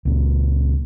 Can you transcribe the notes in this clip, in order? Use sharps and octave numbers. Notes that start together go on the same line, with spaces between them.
C#2 A#2